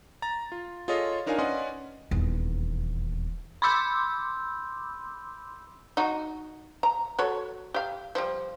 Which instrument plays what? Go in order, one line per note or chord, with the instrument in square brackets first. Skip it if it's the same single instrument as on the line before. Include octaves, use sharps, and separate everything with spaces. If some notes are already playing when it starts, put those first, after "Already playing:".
[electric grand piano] A#5 A6
F4
F4 G#4 A4 C#5 D#5 F5
D4 D#4 A#4 C#5 F5 G#5
C#4 B4 D5 D#5 F#5 C6
[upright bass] D#1 E2
[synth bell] B5 C6 D6 E6 G6
[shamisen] D#4 F#4
A#5
F#4 A4 C#5
G4 F5
F3 G3